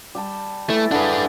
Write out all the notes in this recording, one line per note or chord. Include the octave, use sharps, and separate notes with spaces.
G3 G5 A5
E3 A3 E4
D3 D4 G#4 B4